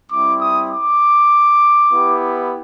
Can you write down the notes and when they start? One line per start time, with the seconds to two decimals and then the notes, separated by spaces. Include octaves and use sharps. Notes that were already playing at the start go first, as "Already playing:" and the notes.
0.10 G3 C4 E4 D6
0.40 D#6
0.71 D6
1.91 B3 E4 G4